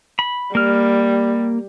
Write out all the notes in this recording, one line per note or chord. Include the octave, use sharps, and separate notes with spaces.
B5
G3 A#3 F6